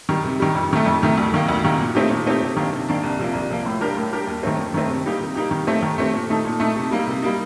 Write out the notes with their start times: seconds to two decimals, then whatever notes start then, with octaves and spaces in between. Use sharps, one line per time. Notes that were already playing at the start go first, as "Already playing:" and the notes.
0.09 D#3 G3
0.24 C3
0.40 D#3 G3
0.55 F2
0.71 C3 D#3 A3
0.86 F2
1.02 C3 D#3 A3
1.18 D2
1.33 C3 D#3 A#3
1.48 D2
1.64 C3 D#3 A#3
1.80 A#2
1.95 A3 C4 D#4 G4
2.10 A#2
2.26 A3 C4 D#4 G4
2.42 C3
2.57 D#3 A#3 D4
2.73 C3
2.89 D#3 A#3 D4
3.03 C2
3.19 C3 F3 A#3
3.34 C2
3.50 C3 F3 A#3
3.66 A2
3.80 G3 D4 G4 A#4
3.97 A2
4.12 G3 D4 G4 A#4
4.27 D#2
4.43 D#3 A3 C4
4.59 D#2
4.74 D#3 A3 C4
4.90 C3
5.05 G3 A#3 D#4 G4
5.21 C3
5.35 G3 A#3 D#4 G4
5.51 D#3
5.67 A3 C4 G4
5.83 D#3
5.98 A3 C4 G4
6.13 A#2
6.30 A3 D#4 A4
6.45 A#2
6.60 A3 D#4 A4
6.76 C3
6.91 G3 A#3 D#4
7.07 C3
7.22 G3 A#3 D#4